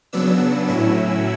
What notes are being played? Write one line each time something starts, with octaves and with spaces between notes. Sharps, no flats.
C#3 F#3 B3 D4 E6
A2 F#3 C#4 E4